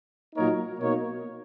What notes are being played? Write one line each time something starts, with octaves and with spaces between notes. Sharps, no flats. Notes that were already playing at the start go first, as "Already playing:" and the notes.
A#2 F#3 A#3 D#4 A#4 C#5
B2 A#3 D#4 A#4 C#5